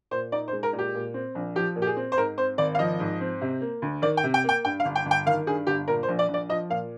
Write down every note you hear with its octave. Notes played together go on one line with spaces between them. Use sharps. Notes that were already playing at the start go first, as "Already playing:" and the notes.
A#2 C5
D#4 D5
C5
G#3
A#4
A#2
G4
A#2
C4
A#1
F3 G4
A#2
G4
G#4
C4
C5
G#2 A#4
C4 C5
G#1 D5
F5
F3 D#5
G#2
C4
C3
A#3
D2
D#3 D5
G5
C3
G5
A#3 G5
G2 G5
F5
G1
G5
G1
G5
D#3 F5
G2 G#4
G1 G4
A#2 A#4
C5
A#1
D5
A#1
D5
F3 D#5
A#2 F5